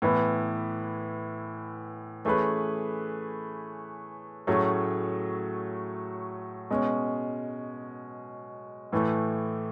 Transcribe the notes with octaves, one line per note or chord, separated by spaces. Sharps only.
A2 E3 B3 E4 B4
E3 A3 C#4 G#4 B4
A2 F#3 A3 C#4 G#4
B2 G#3 C#4
A2 E3 A3